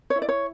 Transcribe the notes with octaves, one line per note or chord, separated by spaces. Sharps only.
C#5
E4
D5
C#5